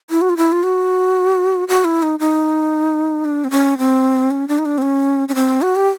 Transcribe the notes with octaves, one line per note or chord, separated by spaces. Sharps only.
E4
F#4
F4
E4
F4
F#4
F#4
E4
D#4
D#4
D4
C4
C#4
C4
C#4
D4
D#4
D4
C4
C#4
C#4
C4
F#4
G4